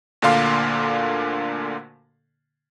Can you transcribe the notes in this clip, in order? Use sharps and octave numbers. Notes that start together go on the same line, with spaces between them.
D2 A#2 D3 A#3 F5 C6